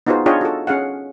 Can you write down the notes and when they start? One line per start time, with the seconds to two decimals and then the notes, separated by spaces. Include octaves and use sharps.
0.07 B3 D#4 F4 F#4 G#4 C5
0.26 D4 F4 G#4 C#5 D#5 G5
0.41 F#4 A4
0.67 C#4 G#4 F5 F#5